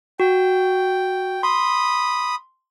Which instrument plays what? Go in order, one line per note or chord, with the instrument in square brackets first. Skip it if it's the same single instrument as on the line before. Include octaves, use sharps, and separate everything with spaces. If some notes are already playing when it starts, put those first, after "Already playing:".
[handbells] F#4 [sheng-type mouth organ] G5
[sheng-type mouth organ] B5 D#6 [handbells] C6